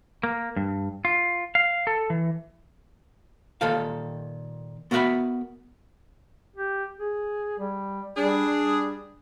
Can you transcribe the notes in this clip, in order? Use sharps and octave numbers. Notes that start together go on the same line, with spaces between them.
A#3
G2
F4
F5
A4
E3
A#2 D#3 A4 F5
B3 F#4 A#4 E5 F#5 B5
G4
G#4
G3
G3 D4 G#4
G3